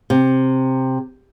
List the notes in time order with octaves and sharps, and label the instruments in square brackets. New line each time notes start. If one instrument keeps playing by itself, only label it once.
[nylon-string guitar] C3